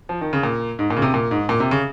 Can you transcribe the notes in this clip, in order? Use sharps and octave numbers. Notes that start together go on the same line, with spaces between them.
F3
D#3
C#3
A#2
G#2
A#2
C#3
C3
A#2
G#2
A#2
C3
C#3